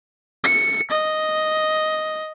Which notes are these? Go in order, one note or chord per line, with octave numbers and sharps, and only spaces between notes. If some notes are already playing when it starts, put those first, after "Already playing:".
C#7
D#5